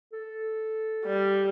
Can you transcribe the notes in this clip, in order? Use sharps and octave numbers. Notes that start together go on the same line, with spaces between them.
A4
G3